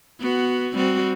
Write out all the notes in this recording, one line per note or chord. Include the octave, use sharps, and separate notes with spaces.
B3 F#4
G3 C4 F#4